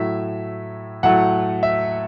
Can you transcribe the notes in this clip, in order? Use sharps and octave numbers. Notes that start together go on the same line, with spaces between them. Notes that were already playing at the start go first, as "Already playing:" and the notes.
Already playing: A2 F#3 A3 E5
A2 F#3 A3 F#5
E5